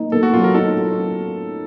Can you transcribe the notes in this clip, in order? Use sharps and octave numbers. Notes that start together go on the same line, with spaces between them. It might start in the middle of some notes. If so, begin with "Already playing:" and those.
Already playing: A#3 D#4
A#3 A4
F#4
F#3 F4
A#4
D#4 A4